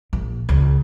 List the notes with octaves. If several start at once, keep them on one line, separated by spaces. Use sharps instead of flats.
A#1
C#2